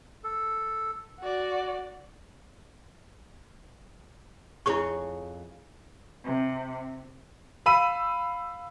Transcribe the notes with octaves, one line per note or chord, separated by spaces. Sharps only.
A4
F#4 D5
F2 E4 G#4 C#5 C#6
C3
F5 B5 E6 D#7